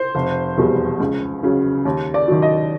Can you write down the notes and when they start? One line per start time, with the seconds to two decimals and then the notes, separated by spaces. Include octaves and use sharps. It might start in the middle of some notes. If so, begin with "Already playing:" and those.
Already playing: C5
0.15 F1
0.58 E2 B2 G3
1.00 C#2
1.43 C#3 F#3
1.85 D#2
2.14 D5
2.28 D#3 F#3
2.42 D#5